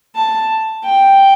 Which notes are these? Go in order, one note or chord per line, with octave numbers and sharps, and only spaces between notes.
A5
G5